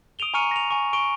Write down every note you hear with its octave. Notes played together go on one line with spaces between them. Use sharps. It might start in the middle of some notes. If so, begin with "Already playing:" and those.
D#6 D7 D#7 F7 G7
G#5 A#5 C#6 F6 C#7 D#7
A#6 F7
G#5 C#6
C#6 D7 G7